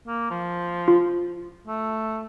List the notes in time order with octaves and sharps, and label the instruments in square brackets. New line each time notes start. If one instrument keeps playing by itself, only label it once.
[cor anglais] A#3
F3
[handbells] F4
[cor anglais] A3